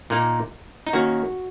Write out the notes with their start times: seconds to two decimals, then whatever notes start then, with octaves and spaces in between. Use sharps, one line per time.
0.10 A#2 A#3 D#4
0.87 D#4
0.93 D#3 A#3 C#4 F#4